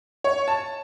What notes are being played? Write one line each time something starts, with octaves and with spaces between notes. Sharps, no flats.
C#5
A5